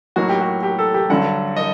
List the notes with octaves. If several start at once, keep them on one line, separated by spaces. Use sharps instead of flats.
A2 F#3 A#3 D#4 F#4
G4
F#4
G4
A4
G4
G2 D3 F#3 F#5
D#5